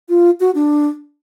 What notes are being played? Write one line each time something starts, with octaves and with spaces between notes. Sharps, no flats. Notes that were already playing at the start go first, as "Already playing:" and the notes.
F4
F#4
D4